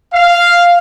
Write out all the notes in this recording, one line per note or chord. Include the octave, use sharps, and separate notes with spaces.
F5